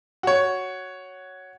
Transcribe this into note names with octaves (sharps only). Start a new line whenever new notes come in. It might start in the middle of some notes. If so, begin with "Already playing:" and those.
F#4 C#5